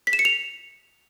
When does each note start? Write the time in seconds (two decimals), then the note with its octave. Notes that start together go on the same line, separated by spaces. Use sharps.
0.07 B6
0.13 E7
0.19 C#7
0.25 F7